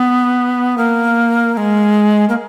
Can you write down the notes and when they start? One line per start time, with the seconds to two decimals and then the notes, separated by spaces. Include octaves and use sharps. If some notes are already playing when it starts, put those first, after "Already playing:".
Already playing: B3
0.78 A#3
1.53 A#3
1.57 G#3
2.29 A#3